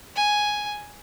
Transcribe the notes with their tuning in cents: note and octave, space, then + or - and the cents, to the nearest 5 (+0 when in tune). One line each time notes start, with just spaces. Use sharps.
G#5 +0